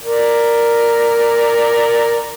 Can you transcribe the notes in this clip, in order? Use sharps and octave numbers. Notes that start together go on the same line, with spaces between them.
A#4 D5